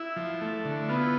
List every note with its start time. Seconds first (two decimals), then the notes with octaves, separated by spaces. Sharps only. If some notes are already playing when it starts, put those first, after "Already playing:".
Already playing: E4
0.16 F3
0.41 A3
0.65 D3
0.89 B3 F4